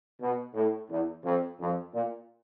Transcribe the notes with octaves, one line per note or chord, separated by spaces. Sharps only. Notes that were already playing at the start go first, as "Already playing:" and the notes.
B2
A2
E2
F2
F2
A#2